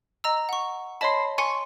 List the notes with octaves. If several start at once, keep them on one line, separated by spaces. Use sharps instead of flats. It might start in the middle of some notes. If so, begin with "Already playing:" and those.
D#5 A#5 E6
F#5 C#6
C#5 D#5 A5 B5 C6
G#5 C6 C#6